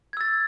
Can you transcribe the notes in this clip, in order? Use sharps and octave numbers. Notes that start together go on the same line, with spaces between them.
E6 G#6 A6